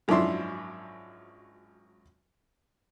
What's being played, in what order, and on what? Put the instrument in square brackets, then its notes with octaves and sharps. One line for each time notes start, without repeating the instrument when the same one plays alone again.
[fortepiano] G#1 F#2 F3 D4 E4 C6